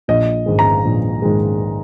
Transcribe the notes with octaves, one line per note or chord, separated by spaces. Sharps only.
A#1 D#5
G#2 D#3 G#3
A#5
A#1
G#2 D#3 G#3